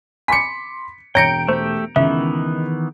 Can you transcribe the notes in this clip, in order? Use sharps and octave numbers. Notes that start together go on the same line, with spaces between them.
G#5 B5 C6 D6 B6 C#7
E1 C#5 G5 A#5 G6 A#6 C#7 D7
A3 G4 C5
C#2 D#3 E3 B3 E5